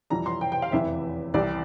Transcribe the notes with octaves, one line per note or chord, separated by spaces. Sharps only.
F2 E3 G3 A#5
C6
G5
G5
F5
F1 E2 E3 E5
C2 C3 E3 D5